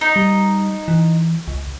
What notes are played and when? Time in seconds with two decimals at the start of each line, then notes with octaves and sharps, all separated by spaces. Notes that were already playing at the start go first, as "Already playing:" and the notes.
0.01 D#4
0.16 G3
0.88 E3
1.48 C#2